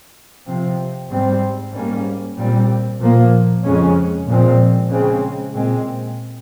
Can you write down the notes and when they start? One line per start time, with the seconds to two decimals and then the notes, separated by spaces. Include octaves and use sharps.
0.46 C3 F3 C4
1.09 G#2 G3 C4
1.72 G#2 G3 A#3 C#4
2.37 A#2 G3 C4
3.00 A#2 F3 A#3
3.63 F2 C#3 G#3 C#4
4.26 A#2 F3 G#3 C4
4.90 C#3 G#3 C4
5.53 A#2 G#3 C4